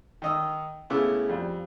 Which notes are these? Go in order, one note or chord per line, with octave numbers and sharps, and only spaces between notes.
D#3 D#5 E6
C#3 A3 B3 E4 D6 E6
F2 G3